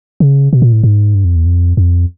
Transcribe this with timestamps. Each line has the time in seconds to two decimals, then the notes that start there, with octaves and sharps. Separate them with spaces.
0.20 C#3
0.53 B2
0.62 A#2
0.72 A2
0.83 G#2
1.15 G2
1.25 F2
1.36 E2
1.46 F2
1.77 F2